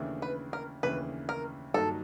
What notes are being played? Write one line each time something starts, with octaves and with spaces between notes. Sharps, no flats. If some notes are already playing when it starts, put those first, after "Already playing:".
Already playing: D#2 C#3 E3 A3 D4
B4
A#4
D#2 C#3 E3 A3 D4 B4
A#4
G2 D#3 F#3 A#3 D#4 A4